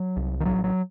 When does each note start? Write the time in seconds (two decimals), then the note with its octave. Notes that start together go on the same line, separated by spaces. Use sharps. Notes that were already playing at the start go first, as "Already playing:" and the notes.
Already playing: F#3
0.17 C2
0.40 D#3
0.45 A1 F#3
0.64 F#3